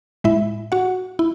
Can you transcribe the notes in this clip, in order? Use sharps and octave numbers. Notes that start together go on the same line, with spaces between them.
A2 G#3 E4 E5
F#4 F#5
E4